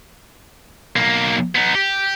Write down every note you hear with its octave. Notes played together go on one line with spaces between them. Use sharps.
B1 A#3
B3 D#4
G4